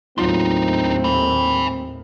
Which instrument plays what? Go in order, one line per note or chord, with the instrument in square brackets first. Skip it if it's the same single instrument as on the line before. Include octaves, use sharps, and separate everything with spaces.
[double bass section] D#2 A2 [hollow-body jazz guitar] F#3 F4 C6 [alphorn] C4 [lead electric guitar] D4 D#4
[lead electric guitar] G#5 B5